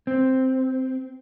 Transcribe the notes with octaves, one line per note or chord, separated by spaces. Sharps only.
C4